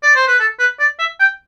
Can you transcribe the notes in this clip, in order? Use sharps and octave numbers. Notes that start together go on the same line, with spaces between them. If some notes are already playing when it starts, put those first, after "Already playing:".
D5
C5
B4
A4
B4
D5
E5
G5